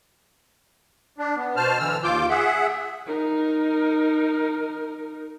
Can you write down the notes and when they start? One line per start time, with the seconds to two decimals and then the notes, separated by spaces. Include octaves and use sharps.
1.18 D4
1.36 B3
1.56 B2 C5 A5 F6
1.79 D3 E3 E6 F6
2.03 D#2 F4 D6 G6
2.29 G#4 E5 F#5
3.07 D#4 A#4